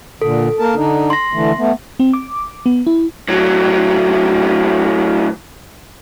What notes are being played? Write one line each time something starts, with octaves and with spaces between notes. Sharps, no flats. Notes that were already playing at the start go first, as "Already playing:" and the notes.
A#2 D3 A4
A#3 A#4 A5
D3 D4 D#4
C6 A#6
D3 E3 A3
A3 B3
C4
D6
B3
E4
A2 F#3